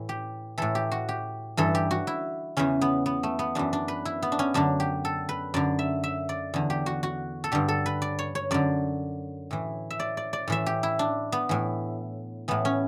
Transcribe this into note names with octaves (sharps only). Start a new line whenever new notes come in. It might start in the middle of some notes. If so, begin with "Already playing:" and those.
Already playing: A2 E3
G4
A2 E3 A4
G4
F#4
G4
G2 E3 A4
G4
F#4
E4
E2 C#3 E3 C#4
B3
B3
A3
B3
F#2 E3 D4
D4
B4
E4
B3
D4
C#4
F#2 D3 D4
G4
A4
B4
F#2 D3 D5
E5
E5
D5
E2 D3
G4
F#4
F#4
A4
G2 D3 G4
A4
B4
D5
C#5
C#5
F#2 D3 D5
A2 E3
E5
D5
D5
D5
A2 E3 E5
G4
E4
D4
B3
A2 E3
A2 E3 B3
C#4